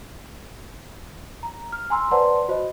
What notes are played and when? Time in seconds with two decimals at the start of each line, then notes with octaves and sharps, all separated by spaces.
1.43 A#5
1.72 F6
1.90 G#5 A#5 C6 E6
2.11 B4 C5 D5 F#5 A5 C6
2.48 F#4 C5 D#5